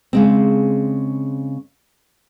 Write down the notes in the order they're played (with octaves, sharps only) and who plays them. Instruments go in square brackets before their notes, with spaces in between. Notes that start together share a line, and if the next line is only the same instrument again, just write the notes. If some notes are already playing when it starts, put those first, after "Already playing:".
[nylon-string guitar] C#3 G#3 C4